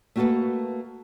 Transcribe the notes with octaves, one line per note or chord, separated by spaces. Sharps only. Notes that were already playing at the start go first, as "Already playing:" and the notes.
A3 A#3 F#4 G4 A4 B4